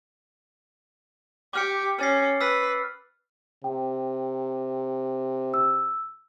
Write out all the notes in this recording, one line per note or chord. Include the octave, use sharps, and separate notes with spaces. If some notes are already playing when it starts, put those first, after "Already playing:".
G4 D6 F6 C#7
C#4 F6 A6 C7
B4 E6 F6 B6
C3 G5
E6